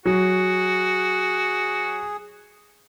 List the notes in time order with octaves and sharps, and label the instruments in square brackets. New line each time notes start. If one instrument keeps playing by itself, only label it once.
[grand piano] F#3 [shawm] F#4 [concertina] G#4